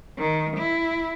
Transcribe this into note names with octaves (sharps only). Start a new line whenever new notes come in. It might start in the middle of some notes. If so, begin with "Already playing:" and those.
D#3
E4